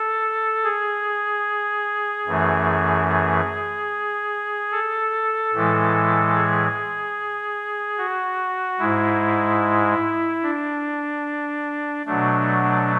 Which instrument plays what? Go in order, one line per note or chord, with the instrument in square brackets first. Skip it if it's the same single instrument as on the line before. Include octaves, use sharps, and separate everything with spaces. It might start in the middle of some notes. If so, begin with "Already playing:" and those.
Already playing: [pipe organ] A4
G#4
F#2 E3 A3
G#4
A4
A2 E3 G#3
G#4
F#4
G#2 G#3 E4
D4
B2 F#3 A3 D4